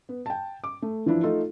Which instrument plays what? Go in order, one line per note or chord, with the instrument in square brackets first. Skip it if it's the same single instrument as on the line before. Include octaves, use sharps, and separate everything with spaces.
[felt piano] B3
G5 A5
D6
A3
E3 F3 D4 E4
A3 D#4 F4 A4